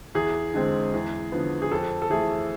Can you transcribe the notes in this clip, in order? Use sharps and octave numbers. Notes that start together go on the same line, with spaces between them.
E2 G#4
D3 G#3 C4
E2
D3 F3 B3
G#4
F2 A4
A4
E3 A3 G#4